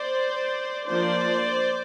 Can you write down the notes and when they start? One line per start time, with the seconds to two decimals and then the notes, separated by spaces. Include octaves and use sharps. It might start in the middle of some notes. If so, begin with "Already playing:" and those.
Already playing: C5 D5
0.87 F3 A#3 D4 C5 D5